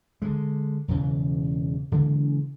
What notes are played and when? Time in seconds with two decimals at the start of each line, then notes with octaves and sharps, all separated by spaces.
0.22 D3 G#3
0.88 E1 C#3 E3
1.92 C#3 E3 G#3 A#3